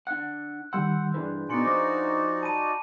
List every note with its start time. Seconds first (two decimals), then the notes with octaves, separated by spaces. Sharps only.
0.07 D4 F#5 F#6
0.73 D#3 G3 F#5 C6 E6 G6
1.14 G2 E3 D4 G#4 B4
1.49 A#2 B3 D#4 F#4 D5 G#5 C6 C#7
1.65 F3 C5 D6 A#6
2.43 A5 B5 D#7